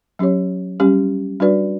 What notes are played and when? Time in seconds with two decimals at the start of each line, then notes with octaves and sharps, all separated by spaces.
0.19 F#3 C#4 G4 C#5
0.80 G3 C#4 G4
1.40 G3 D4 F#4 B4 D5